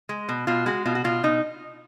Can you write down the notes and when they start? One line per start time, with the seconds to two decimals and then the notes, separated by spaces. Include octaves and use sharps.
0.09 G#3
0.29 B2
0.47 B2 F4
0.66 G#3 F#4
0.86 B2 F4
0.95 F#4
1.04 B2 F4
1.23 B2 D#4